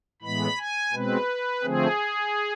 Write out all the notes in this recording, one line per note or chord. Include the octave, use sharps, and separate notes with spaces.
A2 E3 G#3 B3 B5
G#5
B2 G#3 C4 B4
D3 F3 A3 C4 G#4